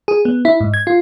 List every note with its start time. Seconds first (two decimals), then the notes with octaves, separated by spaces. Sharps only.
0.08 G#4
0.25 B3
0.45 E4
0.60 G#2
0.74 G#6
0.87 F4